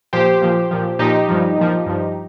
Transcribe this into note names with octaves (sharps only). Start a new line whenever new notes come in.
A#2 F3 G4 C5
A#2 F3
A#2 F3
A#2 F3 D#4 G4
G2 F3
A#2 F3
G2 F3